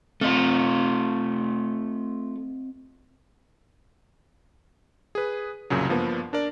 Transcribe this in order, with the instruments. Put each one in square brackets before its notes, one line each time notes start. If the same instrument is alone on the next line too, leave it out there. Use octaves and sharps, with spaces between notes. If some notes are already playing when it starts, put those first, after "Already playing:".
[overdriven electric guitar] A3 F4 [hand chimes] C4 D#5
[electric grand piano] G#4 B4
C2 F#2 A#2 C#3 F#3
G2 F3 A#3 B3
D4 A#4 D5